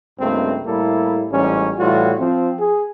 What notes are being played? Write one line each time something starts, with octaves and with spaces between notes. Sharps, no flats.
C#2 G2 A3 A#3 C4
A2 G3 A#3 E4 A4
A1 G#2 G3 C#4
A2 E3 G3 F4 F#4
F3 C4
G#4